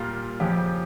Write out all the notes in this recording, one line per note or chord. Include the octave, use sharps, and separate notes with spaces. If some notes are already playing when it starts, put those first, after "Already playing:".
Already playing: A#2 G3 A#3 F4
F2 C#3 F3 G4